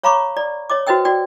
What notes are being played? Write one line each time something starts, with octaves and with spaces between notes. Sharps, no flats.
C#5 F5 A#5 B5 C#6 D6
D5
C#5 D#5 D6
F#4 B4 C5 D#5 G5 E6
F#4 D5 G5